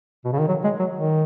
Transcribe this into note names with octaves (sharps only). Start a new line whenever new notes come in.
B2
C#3
D#3
F#3
G#3
F#3
D#3